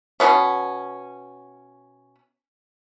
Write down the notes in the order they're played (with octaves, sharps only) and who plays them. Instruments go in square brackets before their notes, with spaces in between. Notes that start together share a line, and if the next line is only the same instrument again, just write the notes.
[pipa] B2 D#3 B3 C#4